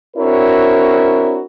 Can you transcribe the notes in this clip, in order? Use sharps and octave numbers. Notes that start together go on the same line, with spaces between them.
C4 D4 E4 F#4 A#4 C#5